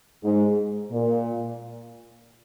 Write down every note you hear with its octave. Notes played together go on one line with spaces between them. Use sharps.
G#2
A#2